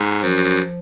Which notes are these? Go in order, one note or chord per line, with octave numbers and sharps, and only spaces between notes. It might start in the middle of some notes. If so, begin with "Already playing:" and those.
Already playing: G#2
F#2 F3